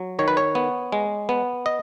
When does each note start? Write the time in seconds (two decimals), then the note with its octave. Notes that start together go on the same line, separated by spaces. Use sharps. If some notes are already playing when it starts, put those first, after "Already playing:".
Already playing: F#3
0.19 D#3 C#5
0.28 B4
0.37 C#5
0.55 B3
0.92 G#3
1.29 B3
1.66 D#5